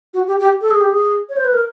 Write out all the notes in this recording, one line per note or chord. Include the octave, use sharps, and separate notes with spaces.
F#4
G4
G4
A4
G#4
G4
G#4
C#5
C5
B4
A#4